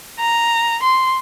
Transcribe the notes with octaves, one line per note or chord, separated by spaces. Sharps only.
A#5
C6